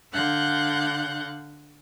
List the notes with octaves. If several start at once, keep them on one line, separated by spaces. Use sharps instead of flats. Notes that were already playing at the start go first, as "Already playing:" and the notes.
D3 F5 F#5 F#6 G6